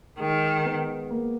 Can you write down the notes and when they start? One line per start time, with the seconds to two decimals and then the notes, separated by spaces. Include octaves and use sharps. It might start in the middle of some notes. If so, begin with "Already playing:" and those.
0.19 D#3 G#3
0.65 B3
1.11 A#3